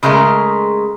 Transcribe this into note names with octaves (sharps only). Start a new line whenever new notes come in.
C#3 G#3 A3 A#4 D#5